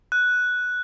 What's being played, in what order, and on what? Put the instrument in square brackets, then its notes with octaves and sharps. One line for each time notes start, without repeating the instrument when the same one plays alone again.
[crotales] F#6